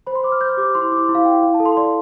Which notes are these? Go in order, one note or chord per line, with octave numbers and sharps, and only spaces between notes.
C5 B5
C6
C5 D6
F6
C5 G6
F6
G4 D6
E4 C6
E4 D6
C6
E4
F5
E4 G5
E4 F5
A5
A4
C6
D5 C6